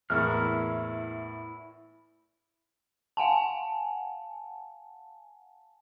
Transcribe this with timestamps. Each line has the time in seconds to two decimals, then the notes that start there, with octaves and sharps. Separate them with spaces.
0.10 E2 A2 A#3 E4 E5 F6
3.17 F5 F#5 G#5 A5